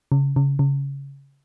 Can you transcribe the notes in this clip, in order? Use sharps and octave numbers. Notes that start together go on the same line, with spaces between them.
C#3
C#3
C#3